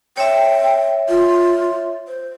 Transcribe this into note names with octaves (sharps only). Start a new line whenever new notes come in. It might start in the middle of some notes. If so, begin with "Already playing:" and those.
C#5 E5 G5
F4
C5